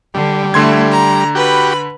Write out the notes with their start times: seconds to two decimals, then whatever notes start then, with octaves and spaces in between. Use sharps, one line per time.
0.14 D3 G3
0.54 D3 A3 E4 C6 G#6
0.90 A#5
1.35 F#4 G4 B4 B5